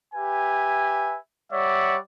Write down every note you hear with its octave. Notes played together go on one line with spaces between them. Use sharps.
G4 B4 E5 G#5
G3 C#5 D5 E5 F#5